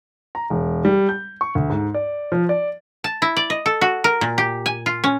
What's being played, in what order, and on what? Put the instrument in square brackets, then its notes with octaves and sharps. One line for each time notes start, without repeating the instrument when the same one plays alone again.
[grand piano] A#5
E1
G3
G6
C#6
D2
G#2
D5
F3
D5
[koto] A5
E4
D5
D#5
A4
F#4
A#4
A#2
G4
G#5
F4
C#4